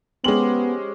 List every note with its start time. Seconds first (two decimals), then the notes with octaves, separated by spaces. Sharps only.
0.24 G#3 B3 C#4 G4 C5 F#7